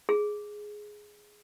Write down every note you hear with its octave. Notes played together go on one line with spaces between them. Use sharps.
G#4